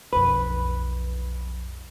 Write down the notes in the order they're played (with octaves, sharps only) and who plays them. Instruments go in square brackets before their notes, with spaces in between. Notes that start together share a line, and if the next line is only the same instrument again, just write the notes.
[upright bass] B1 F2 [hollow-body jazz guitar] B4